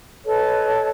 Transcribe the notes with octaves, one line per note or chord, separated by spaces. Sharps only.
A4 B4 C#5 D#5